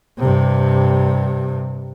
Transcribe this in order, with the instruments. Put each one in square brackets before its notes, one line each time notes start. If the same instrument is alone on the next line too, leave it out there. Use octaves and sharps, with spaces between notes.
[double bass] G2 C3